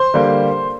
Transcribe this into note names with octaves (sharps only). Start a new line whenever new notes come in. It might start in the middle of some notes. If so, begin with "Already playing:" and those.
Already playing: C5 C6
D3 G3 A#3